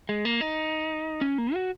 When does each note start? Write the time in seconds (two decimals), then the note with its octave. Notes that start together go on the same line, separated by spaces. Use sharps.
0.09 G#3
0.25 A#3
0.41 D#4
1.21 C#4
1.38 A#3
1.54 F#4